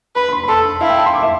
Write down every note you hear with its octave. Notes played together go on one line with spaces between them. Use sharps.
B4 B5
B5
C6
B5
A4 C6
A5
E4 F5
G5
A5
C6
D6
E5